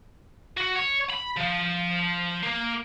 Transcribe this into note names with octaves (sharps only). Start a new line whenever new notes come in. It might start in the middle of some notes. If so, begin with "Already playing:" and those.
F#4
C#5
B5
F3
A#3